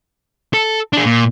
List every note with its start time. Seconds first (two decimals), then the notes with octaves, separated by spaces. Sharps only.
0.54 A4
0.93 D4 G#4
1.06 A#2